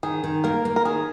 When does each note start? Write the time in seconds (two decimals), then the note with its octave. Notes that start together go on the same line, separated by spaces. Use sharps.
0.03 D#3 G#4
0.24 D#3
0.44 A#3 A#4
0.65 A#3
0.76 A#4
0.85 D#3 G#4